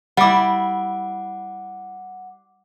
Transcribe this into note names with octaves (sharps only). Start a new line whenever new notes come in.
G3 E4 F#5 D6